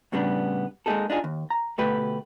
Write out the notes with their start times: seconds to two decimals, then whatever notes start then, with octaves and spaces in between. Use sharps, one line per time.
0.12 A2 C#3 G3 B3 C4 D4
0.86 G#3 A#3 C#4 D#4 G#4 A4
1.10 D4 D#4 F4 G#4
1.24 D#2
1.50 A#5
1.78 D2 B2 A3 G4 B4 G5